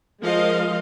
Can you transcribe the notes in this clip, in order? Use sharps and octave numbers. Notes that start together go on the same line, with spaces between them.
F3 G#3 A#4 D#5 F5